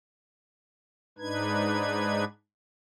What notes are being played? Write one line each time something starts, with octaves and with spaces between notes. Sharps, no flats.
G#2 D4 D#4 B4 G#6